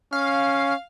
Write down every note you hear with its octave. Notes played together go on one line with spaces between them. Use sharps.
C#4 F5